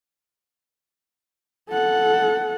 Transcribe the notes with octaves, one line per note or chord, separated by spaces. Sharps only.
A4 F#5